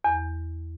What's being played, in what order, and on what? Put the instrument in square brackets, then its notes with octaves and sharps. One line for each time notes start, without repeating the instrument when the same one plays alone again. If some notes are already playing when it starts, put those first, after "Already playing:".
[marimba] E2